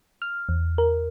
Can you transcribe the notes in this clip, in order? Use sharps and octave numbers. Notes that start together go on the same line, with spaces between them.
F6
E2
A#4